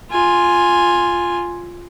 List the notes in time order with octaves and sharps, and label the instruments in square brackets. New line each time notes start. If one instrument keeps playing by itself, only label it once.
[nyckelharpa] F4 G#5